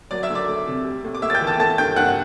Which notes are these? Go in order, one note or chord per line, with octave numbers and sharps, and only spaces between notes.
F#3 D5 D6
E5 E6
D2
D5 D6
A3
C3
G3
A2
D6
A2 E5 E6
A6
G5 G6
E3
A5 A6
A3 A5 A6
G2 G5 G6
G2 F#5 F#6